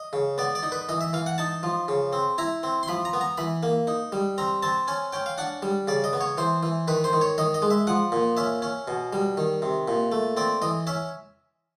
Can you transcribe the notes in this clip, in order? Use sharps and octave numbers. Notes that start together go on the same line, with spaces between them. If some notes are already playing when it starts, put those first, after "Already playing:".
Already playing: D#5
C#3
B3 D5
D5
D#4
B4
E3 D#5
E5
E3 F5
F#5
D#4 A5
F3
C#3
C4
E4 A#5
C4
C6
F3 B5
A#5
B3
A#5
E3 B5
A#3
D#4
G3
C4 A#5
C4 A5
C#4 G#5
C#4 G5
F5
D4 F#5
G3
C#3 D5
D#5
B3
C#5
E3 C5
E3
D#3 B4
C5
D#3
C#5
D#3 D#5
D#5
G#3
E5
F3 F#5
A#2
C#4 E5
C#4
B2
G3
D#3
C3
A#2
A3
C4 D5
E3 D#5
C#4 E5